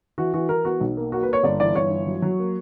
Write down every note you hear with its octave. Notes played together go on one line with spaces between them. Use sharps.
E3 F#4
E3 F#4
E3 A#4
B3 F#4
B1
A#3
A#3 F#4
B4
A#3 C#5
G1 D5
E3 D5
G1 C#5
E3
F#3
F#3
A#3